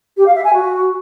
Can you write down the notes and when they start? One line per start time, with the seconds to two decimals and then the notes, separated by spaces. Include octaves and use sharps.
0.17 G4
0.26 F5
0.35 E5
0.44 G#5
0.54 F#4